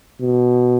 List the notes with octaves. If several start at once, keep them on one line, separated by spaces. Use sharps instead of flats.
B2